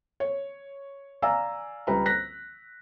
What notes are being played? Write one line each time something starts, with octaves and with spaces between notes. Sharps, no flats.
C#5
D5 F5 G#5 A#5 E6
C#2 G3 B4 A#5
F#6 A#6 B6